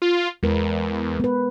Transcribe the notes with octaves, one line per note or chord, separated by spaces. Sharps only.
F4
E2 G#3 A#4 B4
B3 B4